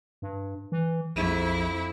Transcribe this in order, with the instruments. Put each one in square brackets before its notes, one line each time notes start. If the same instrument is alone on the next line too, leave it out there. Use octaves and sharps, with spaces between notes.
[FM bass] G2
E3
[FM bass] A#1 [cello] F2 E4